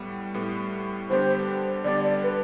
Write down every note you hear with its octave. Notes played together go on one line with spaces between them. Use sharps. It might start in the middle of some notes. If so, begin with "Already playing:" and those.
Already playing: A2 G3 B3
A2 G3 B3
D3 G3 B3 D4 G4 C5
D3 G3 B3 D4 G4 D5
B4